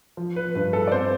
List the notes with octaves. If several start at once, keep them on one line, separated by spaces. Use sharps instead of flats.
F3
B4
G2 B4
A4
D5
C4 C5